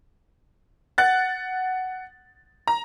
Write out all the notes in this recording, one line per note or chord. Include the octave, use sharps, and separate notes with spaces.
F#5 F#6 A6
A#5